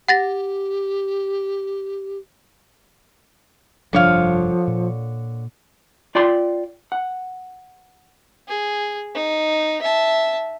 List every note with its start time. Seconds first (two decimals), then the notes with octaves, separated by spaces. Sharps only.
0.08 G4 F#5 A6 A#6
3.93 F1 G2 D3 F3 D4 C#5 F5
4.68 A#2
6.15 F4 D5 G5 C6
6.92 F#5
8.48 G#4
9.15 D#4
9.82 E5 A5